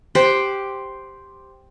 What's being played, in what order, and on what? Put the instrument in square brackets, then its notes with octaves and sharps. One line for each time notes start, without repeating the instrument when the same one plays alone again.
[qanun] G4 C5 F#5